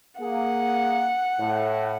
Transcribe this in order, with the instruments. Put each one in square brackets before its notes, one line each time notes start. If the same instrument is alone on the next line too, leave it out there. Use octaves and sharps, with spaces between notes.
[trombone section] A#3 G#4 [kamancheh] F#5
[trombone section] A2